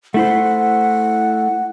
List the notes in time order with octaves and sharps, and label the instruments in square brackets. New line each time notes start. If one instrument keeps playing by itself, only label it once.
[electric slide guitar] A3 E4 C5 [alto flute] F#5